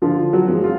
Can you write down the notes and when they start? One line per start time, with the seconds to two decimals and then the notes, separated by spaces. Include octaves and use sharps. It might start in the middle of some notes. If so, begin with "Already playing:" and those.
0.02 D3 F3 F4
0.33 F#3 F#4
0.48 F3 G#3
0.64 F4